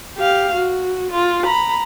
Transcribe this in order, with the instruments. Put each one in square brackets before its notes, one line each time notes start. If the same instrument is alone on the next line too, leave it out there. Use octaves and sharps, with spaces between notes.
[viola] G4 F5
F#4
F4
A#5 B5